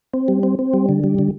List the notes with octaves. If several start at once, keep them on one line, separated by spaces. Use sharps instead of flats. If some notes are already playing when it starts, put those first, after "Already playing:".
C4
G3
C4
C4
G3
D3
G3
D3